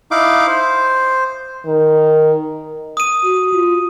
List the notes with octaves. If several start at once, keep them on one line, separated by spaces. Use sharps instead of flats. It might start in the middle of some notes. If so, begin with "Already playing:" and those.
D#4 E4 F5 D6
C5
D#3
D#6 D#7
F#4
F4